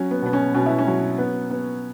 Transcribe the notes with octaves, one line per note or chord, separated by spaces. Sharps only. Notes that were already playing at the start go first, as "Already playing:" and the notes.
Already playing: F#3 C#4
B3
B2 B3
C#4
B2 C#4
E4
C#4
F#3
B3
B3